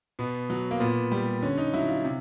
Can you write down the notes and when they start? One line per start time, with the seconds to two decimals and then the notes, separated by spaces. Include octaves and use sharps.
0.19 B2 B3
0.50 F#3
0.71 A#3
0.80 A#2 B3
1.12 G3
1.42 D3 C#4
1.58 D#4
1.74 F#3 E4
1.89 F4
2.04 C3